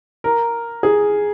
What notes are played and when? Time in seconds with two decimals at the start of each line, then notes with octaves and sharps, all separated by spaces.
0.24 A#4
0.83 G#4